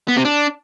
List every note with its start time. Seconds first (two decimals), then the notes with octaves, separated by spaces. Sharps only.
0.08 B3
0.16 C3
0.25 D4